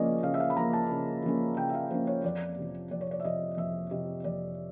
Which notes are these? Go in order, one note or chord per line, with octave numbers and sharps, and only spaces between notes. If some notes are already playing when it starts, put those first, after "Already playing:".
Already playing: C#3 F3 A#3 C#4 D5 D#5
C#3 F5
E5
F5
B5
F3 A#3 C#4 A#5
A5
C#3
F3 A#3 C#4
C#3 G5
E5
F5
F3 A#3 C#4 C5
C#5
F2 D5
C3 F3
F2 D5
C#5
D5
E5
C3 F3 D#5
F2 E5
C3 F3 D#5
F2 D5